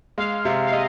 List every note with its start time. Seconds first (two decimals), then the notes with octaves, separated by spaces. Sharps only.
0.18 G#3 F5
0.45 C3
0.67 F5
0.72 C3 D#5